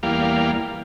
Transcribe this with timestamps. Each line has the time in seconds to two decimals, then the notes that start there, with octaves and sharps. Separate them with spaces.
0.03 E2 G3 A#3 F5